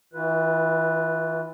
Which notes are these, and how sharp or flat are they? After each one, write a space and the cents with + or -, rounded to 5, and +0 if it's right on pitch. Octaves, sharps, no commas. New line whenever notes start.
E3 -30 F4 +0 B4 +0